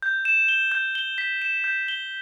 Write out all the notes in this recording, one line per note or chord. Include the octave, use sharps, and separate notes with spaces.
G6
E7
G7
G6
G7
B6
E7
G6
G7